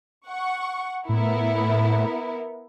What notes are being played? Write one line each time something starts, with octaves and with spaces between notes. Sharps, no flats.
F#5 C#6
A2 B3 E4 A#4